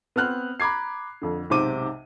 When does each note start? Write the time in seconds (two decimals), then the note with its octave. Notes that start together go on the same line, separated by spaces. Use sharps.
0.16 B3 C4 F6 F#6
0.60 A#5 B5 D6 G#6 C7
1.22 F2 D3
1.50 B1 G#2 C3 C5 D6 D#7